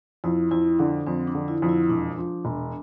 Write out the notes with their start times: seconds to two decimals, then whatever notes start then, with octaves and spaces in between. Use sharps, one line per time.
0.24 F2 E4
0.51 F2 E4
0.79 D3 D4
1.06 F2 C4
1.28 D4
1.35 D3
1.48 E4
1.62 F2
1.69 E4
1.89 E1 D4
2.18 F3
2.45 E1